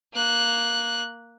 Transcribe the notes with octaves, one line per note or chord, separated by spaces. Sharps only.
A#3 F#6